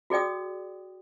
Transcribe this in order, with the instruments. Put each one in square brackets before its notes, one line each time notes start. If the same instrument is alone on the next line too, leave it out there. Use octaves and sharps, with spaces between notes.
[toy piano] F#4 G#4 D5 G5 D#6